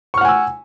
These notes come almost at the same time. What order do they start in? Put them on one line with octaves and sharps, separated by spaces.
C#6 F6 F#5 G#5 E6